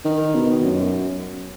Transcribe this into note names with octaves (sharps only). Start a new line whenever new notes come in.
D#3
B2
F#2